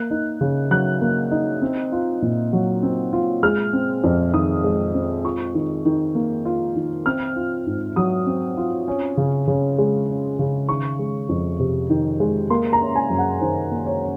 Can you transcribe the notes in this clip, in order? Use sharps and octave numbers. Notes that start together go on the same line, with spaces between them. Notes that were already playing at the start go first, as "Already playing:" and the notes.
Already playing: A#3 F#6
D#4
C#3
F#3 F#6
A#3
D#4
C4
F4
A#2
F#3
C4
F4
G#3 F6
C4
F2
D#3 D#6
G#3
C4
F4 C#6
D#3
D#3
A#3
F4
D#3
C4 F6
F4
G#2
F#3 D#6
C4
F4
C#4
C#3
C#3
G#3
C#4
C#3
D#3 C#6
G#3
F2
C3
D#3
G#3
A#3 C6
A#5
C#4
G#5
F#2
F#5
D#3 C5
A#3
C#5
C#4